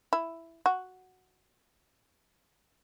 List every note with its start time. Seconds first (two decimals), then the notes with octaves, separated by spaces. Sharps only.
0.13 E4
0.66 F#4